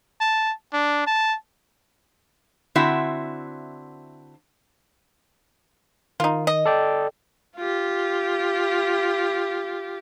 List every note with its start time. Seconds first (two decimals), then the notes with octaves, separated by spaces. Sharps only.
0.21 A5
0.74 D4
1.07 A5
2.75 D3 C4 E4 F#4 E5
6.20 D#3 D#4 F4
6.47 D#5
6.66 A4 D5 G5
7.56 F4 G4